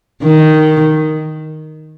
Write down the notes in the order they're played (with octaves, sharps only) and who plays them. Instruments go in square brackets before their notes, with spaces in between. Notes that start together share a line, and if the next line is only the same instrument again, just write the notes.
[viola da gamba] D#3